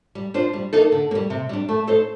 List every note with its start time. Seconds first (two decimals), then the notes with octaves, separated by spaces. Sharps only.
0.15 G3
0.34 D4 F4 C5
0.53 G3
0.73 A#3 D#4 A4
0.92 D3
1.11 A#3
1.15 G3
1.30 C3
1.49 G3 D4
1.69 A3
1.87 D#4 A4 C5